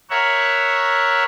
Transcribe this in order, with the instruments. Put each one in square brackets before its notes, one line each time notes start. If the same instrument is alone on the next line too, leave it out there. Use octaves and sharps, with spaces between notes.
[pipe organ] A#4 C#5 E5 F#5